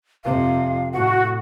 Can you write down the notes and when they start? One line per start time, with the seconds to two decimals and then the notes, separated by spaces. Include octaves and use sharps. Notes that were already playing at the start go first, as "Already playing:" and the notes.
0.24 F2 C3 F5
0.93 A2 F#4 F#5